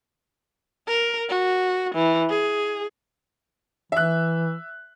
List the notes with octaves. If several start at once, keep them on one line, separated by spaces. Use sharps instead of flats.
A#4
F#4
E3
G#4
E3 E5 F#6